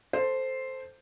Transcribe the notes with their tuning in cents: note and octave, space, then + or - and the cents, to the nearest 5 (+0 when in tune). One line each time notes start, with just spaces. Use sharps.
A4 +0 C5 +0